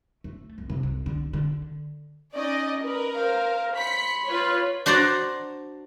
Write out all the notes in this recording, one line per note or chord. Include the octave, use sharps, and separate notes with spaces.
A3
C2
C3
C2
D3
D3
C#4 D#4 D5 D#5
A#4 B4
C5 F5
B5 C6 B6 C#7
F4 B4 C#5
D4 F#4 C5 D5 A#5